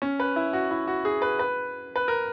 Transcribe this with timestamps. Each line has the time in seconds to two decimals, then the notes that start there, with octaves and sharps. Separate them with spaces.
0.02 C#4
0.20 B4
0.36 E4
0.53 F#4
0.71 E4
0.87 F#4
1.05 G#4
1.22 B4
1.39 B4
1.96 B4
2.08 A#4